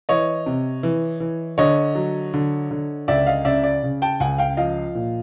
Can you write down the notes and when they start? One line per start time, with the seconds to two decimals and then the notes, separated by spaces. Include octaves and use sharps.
0.09 E3 C#5 D#5
0.46 C3
0.83 E3
1.20 E3
1.58 D3 C#5 D#5
1.95 F#3
2.34 D3
2.71 D3
3.08 C#2 D5 E5
3.26 D#5 F5
3.45 C#3 D5 E5
3.63 D5
3.83 C#3
4.02 G5 A5
4.20 C#2 F#5 G#5
4.38 F5 G5
4.57 F3 D#5 F5
4.95 A#2